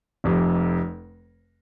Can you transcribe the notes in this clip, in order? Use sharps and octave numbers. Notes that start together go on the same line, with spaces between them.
F1 F2 C3